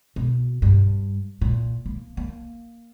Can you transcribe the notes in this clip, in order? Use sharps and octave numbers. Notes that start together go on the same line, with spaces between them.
B2
G2
A#2
A#3
A#3